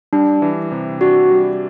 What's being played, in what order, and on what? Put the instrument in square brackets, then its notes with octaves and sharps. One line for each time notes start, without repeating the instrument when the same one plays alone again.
[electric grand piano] G3 [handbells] D4
[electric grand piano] E3
C3
[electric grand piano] D4 [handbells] F#4
[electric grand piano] G3